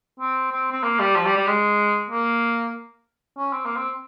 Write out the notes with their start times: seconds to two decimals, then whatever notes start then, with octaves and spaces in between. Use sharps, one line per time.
0.20 C4
0.51 C4
0.72 C4
0.83 A#3
0.99 G3
1.15 F3
1.25 G3
1.36 G3
1.47 G#3
2.10 A#3
3.37 C#4
3.53 C4
3.65 A#3
3.76 C4